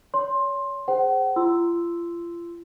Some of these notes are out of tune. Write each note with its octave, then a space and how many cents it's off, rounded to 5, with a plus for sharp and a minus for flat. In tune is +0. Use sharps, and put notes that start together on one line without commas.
C#5 +30 C6 +15
G#4 -5 C5 +0 F#5 +40
F4 -35 C6 -10 E6 +0